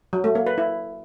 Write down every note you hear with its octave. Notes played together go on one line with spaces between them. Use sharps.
F#3
A3
A#3
B4
E4